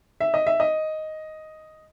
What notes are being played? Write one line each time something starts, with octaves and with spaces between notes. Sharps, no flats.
E5
D#5
E5
D#5